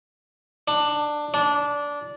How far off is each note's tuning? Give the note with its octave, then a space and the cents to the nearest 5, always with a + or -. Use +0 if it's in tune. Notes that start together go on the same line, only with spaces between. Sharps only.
D4 +15
D4 -15